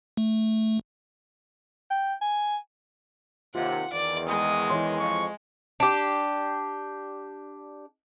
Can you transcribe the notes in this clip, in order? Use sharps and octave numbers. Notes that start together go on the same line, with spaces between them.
A3
G5
G#5
D#2 C3 F4 F#5
E2 D#3 D5
G#3 D#6
E3 C#5 C6
F2 C#6
D4 G4